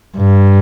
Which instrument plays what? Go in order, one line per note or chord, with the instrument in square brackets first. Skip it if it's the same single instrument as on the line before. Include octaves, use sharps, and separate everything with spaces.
[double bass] G2